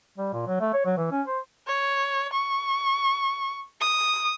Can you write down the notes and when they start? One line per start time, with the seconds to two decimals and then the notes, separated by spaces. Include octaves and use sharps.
0.18 G3
0.34 A#2
0.47 F#3
0.60 A3
0.74 C#5
0.85 F#3
0.97 E3
1.11 C#4
1.27 C5
1.67 C#5
2.33 C#6
3.81 D#6